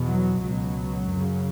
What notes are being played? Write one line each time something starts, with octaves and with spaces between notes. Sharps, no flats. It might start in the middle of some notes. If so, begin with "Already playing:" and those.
Already playing: E2 B2
F#3
C#2 B2 F#3
F#2 C#3